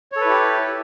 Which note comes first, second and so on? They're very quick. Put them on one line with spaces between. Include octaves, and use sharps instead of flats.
C#5 A4 B4 E4 G4